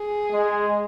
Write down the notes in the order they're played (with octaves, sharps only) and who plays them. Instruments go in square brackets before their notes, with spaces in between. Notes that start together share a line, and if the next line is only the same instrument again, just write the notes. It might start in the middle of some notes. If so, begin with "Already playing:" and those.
Already playing: [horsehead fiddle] G#4
[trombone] G#3